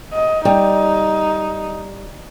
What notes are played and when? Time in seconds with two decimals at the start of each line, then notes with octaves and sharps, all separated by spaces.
0.13 D#5
0.45 G3 D#4